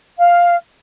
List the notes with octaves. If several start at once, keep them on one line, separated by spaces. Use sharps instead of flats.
F5